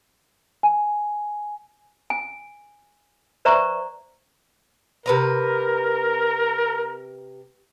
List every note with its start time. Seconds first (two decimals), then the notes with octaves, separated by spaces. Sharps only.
0.63 G#5
2.10 G#5
3.45 B4 C5 D5 E5 A#5 C#6
5.06 C3 A#4 B4 A#5